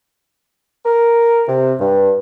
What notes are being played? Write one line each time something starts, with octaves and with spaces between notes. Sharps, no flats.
A#4
C3
G2